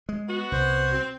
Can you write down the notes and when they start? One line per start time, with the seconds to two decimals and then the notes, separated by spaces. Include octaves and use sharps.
0.09 G#3
0.28 B3 F#4
0.52 C2 C5
0.93 C4